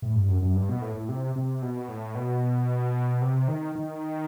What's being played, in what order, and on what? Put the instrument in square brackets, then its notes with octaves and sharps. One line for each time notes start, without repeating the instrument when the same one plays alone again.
[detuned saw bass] A2
G2
F#2
F#2
G2
B2
A2
A2
C3
C3
B2
A2
B2
C3
D#3
D#3